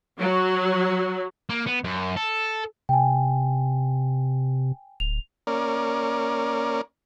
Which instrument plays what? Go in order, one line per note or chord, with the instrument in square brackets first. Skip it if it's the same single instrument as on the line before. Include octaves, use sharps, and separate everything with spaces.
[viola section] F#3
[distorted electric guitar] A#3
B3
F#2
A4
[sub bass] C3 [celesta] G5 G#5
[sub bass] D1 [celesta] F7
[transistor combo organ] A#3 C#4 A#4 D5